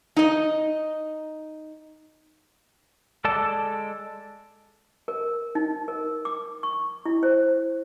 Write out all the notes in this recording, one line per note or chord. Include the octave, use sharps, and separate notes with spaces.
D#4 D#5
G#3 A4 D5 A5
A#4
D#4
A#4
D6
C#6
E4
C5